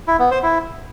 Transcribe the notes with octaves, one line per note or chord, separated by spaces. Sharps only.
E4
B3
C5
E4